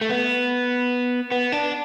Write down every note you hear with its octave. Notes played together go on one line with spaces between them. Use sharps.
A3
B3
B3
D4